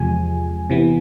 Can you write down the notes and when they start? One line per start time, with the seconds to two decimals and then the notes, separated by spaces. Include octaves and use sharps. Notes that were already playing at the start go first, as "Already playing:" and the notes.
Already playing: E2 C3 F3 G#3 G#5
0.70 C3 E3 B3